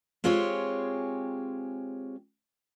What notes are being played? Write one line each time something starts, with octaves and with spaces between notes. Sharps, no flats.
G#3 C4 F4 G4 G#4 C#5